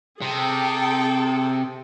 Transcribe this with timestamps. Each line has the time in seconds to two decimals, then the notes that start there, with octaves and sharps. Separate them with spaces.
0.22 C3 G#4 A4 G5